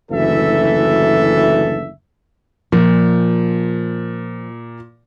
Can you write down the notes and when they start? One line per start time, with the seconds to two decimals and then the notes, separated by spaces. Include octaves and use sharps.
0.11 F#1 D2 E3 A4 E5
2.72 A#2 F3